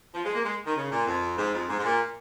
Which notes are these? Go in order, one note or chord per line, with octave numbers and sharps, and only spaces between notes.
F3
G#3
A#3
G#3
D#3
C#3
A#2
F2
G#2
F2
G#2
G#2
A#2